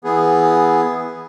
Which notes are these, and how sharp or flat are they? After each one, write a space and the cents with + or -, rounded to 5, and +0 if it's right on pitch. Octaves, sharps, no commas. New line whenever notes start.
E3 +0 B3 +0 G#4 +0